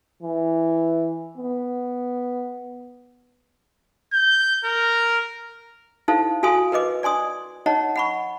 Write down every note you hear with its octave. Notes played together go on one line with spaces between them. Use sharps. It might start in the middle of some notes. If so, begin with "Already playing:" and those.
E3
B3
G6
A#4
D#4 E4 A4 C5 F5
F#4 A4 F5 G#5 C6 D#6
A#4 B4 D#5 D6
D5 G#5 C6 D#6
D#4 C#5 D#5 F#5 A#5
F#5 B5 C#6